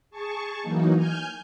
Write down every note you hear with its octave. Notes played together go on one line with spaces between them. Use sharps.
G#4 A5 C#6
E3 F#3 A#3 D#4
G#5 F6 G6